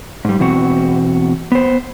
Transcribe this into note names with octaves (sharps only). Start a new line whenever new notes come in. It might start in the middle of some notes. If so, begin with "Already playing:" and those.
G#2 G3
E2 B2 C4 F#4
B3 C5